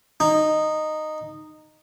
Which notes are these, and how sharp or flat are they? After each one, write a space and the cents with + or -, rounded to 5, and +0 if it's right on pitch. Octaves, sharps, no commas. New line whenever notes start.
D#4 -10